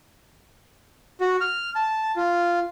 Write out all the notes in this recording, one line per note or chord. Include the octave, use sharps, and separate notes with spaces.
F#4
F6
A5
F4